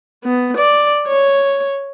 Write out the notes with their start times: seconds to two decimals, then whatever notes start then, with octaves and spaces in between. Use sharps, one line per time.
0.24 B3
0.57 D5
1.07 C#5